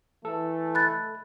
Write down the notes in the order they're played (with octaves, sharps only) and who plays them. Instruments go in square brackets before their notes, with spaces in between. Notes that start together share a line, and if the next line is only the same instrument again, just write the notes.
[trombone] E3 [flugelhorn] A3 [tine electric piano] A4
[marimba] B5 F#6 A6